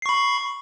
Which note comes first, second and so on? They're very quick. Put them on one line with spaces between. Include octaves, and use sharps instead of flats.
C7 C#6 B5